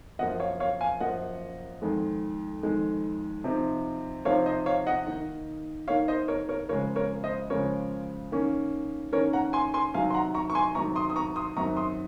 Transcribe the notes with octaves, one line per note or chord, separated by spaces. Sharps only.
F#2 F3 A#3 D#5 F#5
C#5 F5
C#5 F5
F5 G#5
F#2 F3 A#3 D#5 F#5
F2 D#3 G#3
F2 D#3 G#3
C3 F3 C4 D#4
C3 F3 C4 D#4 C#5 F5
C5 D#5
C#5 F5
D#5 F#5
D#3 A#3 D#4
D#3 A#3 D#4 C#5 F5
C5 D#5
A#4 C#5
A#4 C#5
C#3 F3 G#3 A#4 C#5
A#4 C#5
C5 D#5
C#3 F3 G#3 A#4 C#5
D#3 A#3 C#4
D#3 A#3 C#4 A#4 C#5
F#5 A#5
G#5 C6
G#5 C6
C3 D#3 F#3 F5 G#5
C6
F#5 A#5
A#5 C#6
C#6
G#5 C6
C3 D#3 F#3 A#5 C#6
C6 D#6
D#6
A#5 C#6
C6 D#6
F#2 D#3 F#3 C4 A#5 C#6
C6 D#6